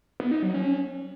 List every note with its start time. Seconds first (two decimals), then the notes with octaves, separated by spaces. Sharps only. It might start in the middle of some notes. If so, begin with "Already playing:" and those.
0.20 B3
0.31 D#4
0.43 F#3
0.54 C#4